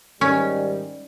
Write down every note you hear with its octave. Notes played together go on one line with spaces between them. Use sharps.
G#2 D#3 G3 C#4